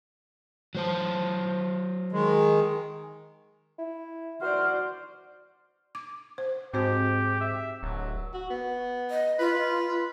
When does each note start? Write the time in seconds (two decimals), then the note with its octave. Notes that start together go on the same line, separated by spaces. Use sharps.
0.75 F#3 C5 A5
2.12 D#3 G#3
3.79 E4
4.42 F#4 C5 D5 F6
5.95 D6
6.38 C5
6.74 G#2 C4 F#4 G4 C5
7.41 E5
7.83 D1 F#3
8.33 F#4
8.50 B3
9.11 D#5
9.39 F4 B4